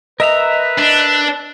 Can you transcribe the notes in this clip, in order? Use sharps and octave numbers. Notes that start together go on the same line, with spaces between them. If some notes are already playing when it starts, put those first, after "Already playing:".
A#4 B4 D#5 E5 A#5
D4